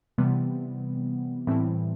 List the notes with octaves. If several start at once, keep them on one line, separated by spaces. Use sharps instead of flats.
C3 E3 G3 B3
A2 E3 G3 C4 E4